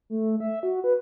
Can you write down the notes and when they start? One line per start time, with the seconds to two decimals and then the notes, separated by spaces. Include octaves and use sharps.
0.10 A3
0.40 E5
0.63 F#4
0.84 B4